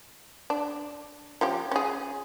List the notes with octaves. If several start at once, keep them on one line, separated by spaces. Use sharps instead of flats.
D4
F3 C#4 G4
C#4 G#4